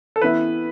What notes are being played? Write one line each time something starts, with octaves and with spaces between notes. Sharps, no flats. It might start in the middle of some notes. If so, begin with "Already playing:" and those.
A4
E3 B3 E4 B4